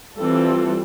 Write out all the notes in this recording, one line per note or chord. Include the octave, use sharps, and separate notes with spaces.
E3 G3 C4 F4 A4